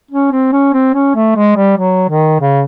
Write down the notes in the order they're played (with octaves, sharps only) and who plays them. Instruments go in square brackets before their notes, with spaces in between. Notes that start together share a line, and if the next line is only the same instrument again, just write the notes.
[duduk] C#4
C4
C#4
C4
C#4
A3
G#3
G3
F#3
D#3
C#3